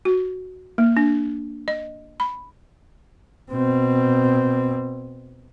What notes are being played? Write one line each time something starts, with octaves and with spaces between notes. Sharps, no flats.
F#4
A#3
D4
D#5
B5
B2 C4